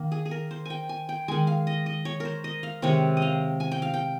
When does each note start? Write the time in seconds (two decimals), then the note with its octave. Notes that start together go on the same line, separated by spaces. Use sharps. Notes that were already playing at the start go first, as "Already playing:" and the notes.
Already playing: D#3 A#3
0.12 G#4
0.25 G#4
0.31 A#4
0.51 C5
0.65 G5 G#5
0.89 G#5
1.09 G5
1.28 D#3 G#3 G#5
1.47 F5
1.67 D#5
1.86 D#5
2.05 C#5
2.20 A#4 C5
2.44 D#5
2.63 F5
2.82 C3 D#3 G#3 C#5
3.17 D#5 F5
3.60 G#5
3.72 G5
3.82 F5
3.94 G5